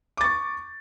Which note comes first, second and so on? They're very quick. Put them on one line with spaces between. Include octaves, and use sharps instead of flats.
D6 A6 C#6